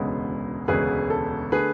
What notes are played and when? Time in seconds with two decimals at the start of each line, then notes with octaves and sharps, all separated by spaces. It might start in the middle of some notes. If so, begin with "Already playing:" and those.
Already playing: E1 D2 C#3 G#3 B3
0.68 E1 D2 C#3 G#3 B3 G#4 B4
1.10 A4
1.52 D3 A3 G#4 B4